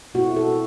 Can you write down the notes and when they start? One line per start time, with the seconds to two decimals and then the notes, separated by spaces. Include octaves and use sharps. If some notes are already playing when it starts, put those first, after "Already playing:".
0.14 B2 A3 C4 E4 F#4
0.36 A4